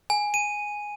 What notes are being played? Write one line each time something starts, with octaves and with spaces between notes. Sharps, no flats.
G#5
D#7